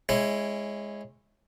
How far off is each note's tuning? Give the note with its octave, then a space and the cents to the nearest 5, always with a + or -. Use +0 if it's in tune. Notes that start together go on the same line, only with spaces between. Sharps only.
G#3 +0 C#4 -20 E4 +10